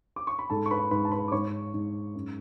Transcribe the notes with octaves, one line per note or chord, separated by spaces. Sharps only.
D6
C#6
B5
G#2 A4 A5
C#6
B4 B5
G#2 B4 B5
A5
B4 B5
D6
G#2 C#5 C#6
G#2
F#2